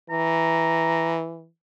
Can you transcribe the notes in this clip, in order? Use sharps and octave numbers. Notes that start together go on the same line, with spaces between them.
E3 A#5